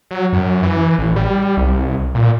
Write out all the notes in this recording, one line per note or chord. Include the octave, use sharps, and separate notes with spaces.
F#3
F#2
E3
A1
G3
C2
A#2